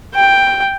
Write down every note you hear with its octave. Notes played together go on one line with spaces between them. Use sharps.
G5